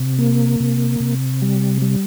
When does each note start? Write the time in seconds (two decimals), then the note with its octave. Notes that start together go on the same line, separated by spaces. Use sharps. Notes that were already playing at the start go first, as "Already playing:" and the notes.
Already playing: C3
0.18 A#3
0.60 C3
1.00 C3
1.42 G3
1.82 G3